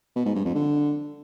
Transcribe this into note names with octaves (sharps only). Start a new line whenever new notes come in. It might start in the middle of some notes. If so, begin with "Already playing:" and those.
B2
G#2
G2
F2
D3